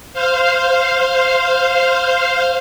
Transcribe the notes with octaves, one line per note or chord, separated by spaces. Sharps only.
C5 F5